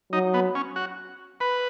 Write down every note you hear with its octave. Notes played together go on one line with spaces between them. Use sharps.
F#3 D#4
B3
C#4
F#4
B4